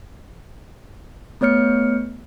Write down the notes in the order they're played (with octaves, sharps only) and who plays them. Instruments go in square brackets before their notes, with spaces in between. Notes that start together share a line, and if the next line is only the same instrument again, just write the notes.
[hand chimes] A3 B3 C#5 F6 C#7